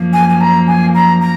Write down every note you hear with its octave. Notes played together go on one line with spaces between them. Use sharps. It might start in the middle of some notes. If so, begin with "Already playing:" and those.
Already playing: F#2 F3 A#3
G#5
G#5
A#5
G#5
A#5
A#5